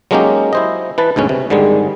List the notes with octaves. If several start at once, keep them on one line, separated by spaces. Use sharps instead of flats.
F#3 G#3 A#3 C#4 D#4 G4
E4 C5 D#5
E3 B4 A5
D2 G#2 B2 C#4
C3
G#2 D3 D#3 G3 G#3